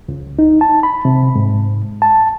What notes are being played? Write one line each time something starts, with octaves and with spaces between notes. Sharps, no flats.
C#2
D#4
A5
B5
C3
G#2
A5